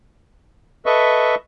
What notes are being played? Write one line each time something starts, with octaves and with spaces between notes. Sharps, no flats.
A4 B4 D#5 E5 C#6